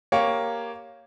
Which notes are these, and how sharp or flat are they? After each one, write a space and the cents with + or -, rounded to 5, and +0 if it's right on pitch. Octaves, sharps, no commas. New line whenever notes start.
A#3 +0 G4 +0 C#5 +0